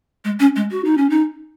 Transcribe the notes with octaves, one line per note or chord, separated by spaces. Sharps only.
G#3
C#4
G#3
F#4
D#4
C#4
D#4